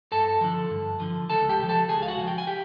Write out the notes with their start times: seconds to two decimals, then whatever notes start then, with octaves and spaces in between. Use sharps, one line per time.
0.12 G2 A4 A5
0.41 D3 F3
0.70 G2
1.00 D3 F3
1.30 C#2 A4 A5
1.49 G4 G5
1.59 C#3
1.64 F3
1.69 A4 A5
1.89 C#2 G#4 G#5
2.03 F5
2.08 F#4 F#5
2.18 C#3
2.21 F3
2.28 G5
2.38 G#5
2.47 G4 G5